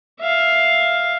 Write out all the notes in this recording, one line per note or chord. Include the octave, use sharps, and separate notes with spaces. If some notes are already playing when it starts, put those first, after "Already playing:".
E5 F5